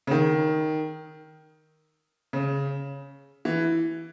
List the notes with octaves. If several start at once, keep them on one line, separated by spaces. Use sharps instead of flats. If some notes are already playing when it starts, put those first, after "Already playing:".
C#3
D#3
C#3
E3